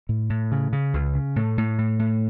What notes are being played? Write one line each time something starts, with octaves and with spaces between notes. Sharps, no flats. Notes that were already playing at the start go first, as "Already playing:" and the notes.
A2
A2
C#3
C#3
C#2
C#3
A2 A3
A2
A2
A2